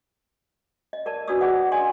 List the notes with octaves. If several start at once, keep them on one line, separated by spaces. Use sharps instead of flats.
D#5
A#4 D5 A5
D4 F#4 B4 D5 D#6 E6
F#4 G#4 D5 D#5 F#5
D4 D5 D#5 G#5 C6